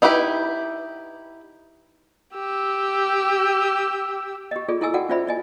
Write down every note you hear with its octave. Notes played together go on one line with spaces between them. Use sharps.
D#4 E4 F#4 G4 B4
G4 E6
G4 D#5
F4 G#4 A4 D5
E4 A4 A#4 D#5 G#5 E6
F#4 A4 A#4 D5 F#5 G5
C#4 F4 C5 D5 E5 B5
D5 D#5 G#5